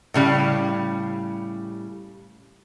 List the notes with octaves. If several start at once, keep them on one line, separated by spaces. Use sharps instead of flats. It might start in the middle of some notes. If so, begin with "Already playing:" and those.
A2 C#3 G3 G4